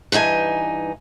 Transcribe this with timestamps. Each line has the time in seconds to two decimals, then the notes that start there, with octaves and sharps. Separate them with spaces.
0.12 G2 E3 D#4 G#5